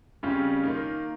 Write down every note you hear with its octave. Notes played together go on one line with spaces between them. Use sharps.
F2 C#3 G3 C#4 F4
D#3 A#3 F4